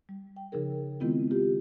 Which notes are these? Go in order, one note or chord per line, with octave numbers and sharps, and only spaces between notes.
G3
G5
C#3 F3 D#4 G#4 A#4
D#3 G#3 B3 C4 E4 F4
F4 G4